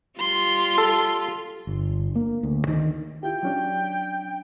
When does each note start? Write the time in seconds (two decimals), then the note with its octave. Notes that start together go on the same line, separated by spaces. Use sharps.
0.19 G3 F4 C6
0.78 A4
1.67 G1
2.15 A#3
2.43 D2
2.68 D#3
3.23 E4 F4 G4 G5
3.43 F#3 C#4 D4